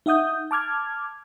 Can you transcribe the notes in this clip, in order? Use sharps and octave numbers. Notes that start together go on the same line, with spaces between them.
D#4 E5 F#5 D#6 G6
A5 D6 F6 G#6